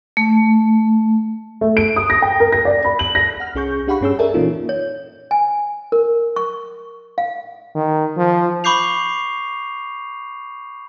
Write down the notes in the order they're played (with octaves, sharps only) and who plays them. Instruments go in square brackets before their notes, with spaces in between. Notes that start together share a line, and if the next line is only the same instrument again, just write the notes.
[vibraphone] A3
[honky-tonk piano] A3
D7
D#6
A#6
G5
A#4
A#6
D5
B5
F#7
A#6
[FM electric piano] F#5 F6
C2 C#4 G#4 C#6 G6
D4 G4 F5 F#5 B5 C#6
G2 C#4 G#4 E6
A4 A#4 D5 E5 G#5 A5
A#2 E3 A#3 C#4 D#4 F4
[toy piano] C#5
G#5
A#4
C#6
F5
[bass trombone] D#3
F3
[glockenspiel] B5 C#6 D6 G6 C7 F7